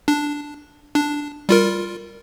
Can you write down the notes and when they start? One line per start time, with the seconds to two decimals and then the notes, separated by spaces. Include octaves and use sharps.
0.08 D4
0.95 D4
1.49 G3 F4 A#4